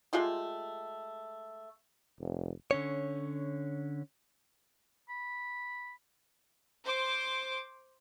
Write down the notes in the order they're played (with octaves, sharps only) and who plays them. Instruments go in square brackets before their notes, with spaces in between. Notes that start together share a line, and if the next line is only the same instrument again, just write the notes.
[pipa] G#3 A3 F4 G4
[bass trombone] F1
[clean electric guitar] D3 C#4 C#5
[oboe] B5
[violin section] C5 D6